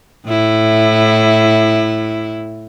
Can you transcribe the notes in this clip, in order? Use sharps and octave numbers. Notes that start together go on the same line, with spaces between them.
A2 E4